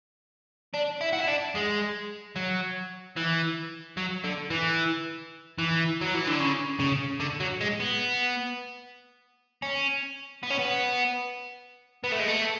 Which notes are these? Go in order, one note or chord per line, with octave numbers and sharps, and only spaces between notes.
D4
E4
F#4
E4
D4
G#3
F#3
E3
F#3
D3
E3
E3
F#3
E3
D3
C#3
C#3
D3
F#3
G#3
B3
C#4
B3
C#4
B3
B3
A3
G#3
A3